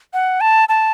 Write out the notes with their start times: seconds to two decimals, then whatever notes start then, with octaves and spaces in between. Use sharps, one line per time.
0.14 F#5
0.41 A5
0.69 A5